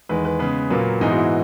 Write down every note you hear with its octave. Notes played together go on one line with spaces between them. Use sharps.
E2 D#3 G#3 B4
B4
C#3 G#3 B3 B4
A#2 F#3 A#3 B4
G#2 E3 G#3 B3 D#4
F#4
E4